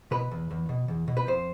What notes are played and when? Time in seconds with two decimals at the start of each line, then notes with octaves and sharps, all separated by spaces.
0.11 B2 B4
0.31 E2
0.51 E2
0.69 B2
0.88 E2
1.08 B2
1.17 B4
1.27 F2 C5